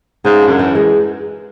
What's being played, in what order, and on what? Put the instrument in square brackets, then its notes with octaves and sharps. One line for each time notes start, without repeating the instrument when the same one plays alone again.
[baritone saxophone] G#2 [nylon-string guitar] C#3
[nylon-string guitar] D4
[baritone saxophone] F#2
[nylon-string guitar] E3
G#3